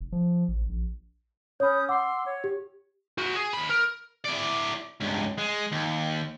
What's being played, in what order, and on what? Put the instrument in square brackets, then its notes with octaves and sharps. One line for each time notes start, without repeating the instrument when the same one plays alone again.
[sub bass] F1
F3
A1
A#1
[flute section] C#4 D#6 G6 [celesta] C#5 B5
[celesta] F#5 D6 [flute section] C6 E6
[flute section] C#5
[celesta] G4
[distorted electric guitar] F#4 C5
G#4
D#2 B5
A#4
E4 D5
C#2 G2
G#3
D#2